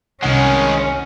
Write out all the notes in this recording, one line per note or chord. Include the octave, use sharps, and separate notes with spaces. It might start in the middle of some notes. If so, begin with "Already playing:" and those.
C2 D#3 G#3 C#4 F#5